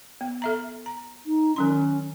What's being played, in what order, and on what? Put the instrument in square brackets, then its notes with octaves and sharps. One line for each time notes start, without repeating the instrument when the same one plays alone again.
[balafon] B3
A4 E5 A#5
A#5
[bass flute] D#4
[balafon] D#3 F#3 C6 [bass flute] C#4